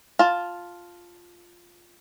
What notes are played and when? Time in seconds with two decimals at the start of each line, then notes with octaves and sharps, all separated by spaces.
0.19 F4 A5